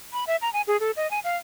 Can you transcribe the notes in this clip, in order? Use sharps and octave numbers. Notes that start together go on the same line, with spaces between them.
B5
E5
A#5
G#5
G#4
A4
D#5
G#5
F5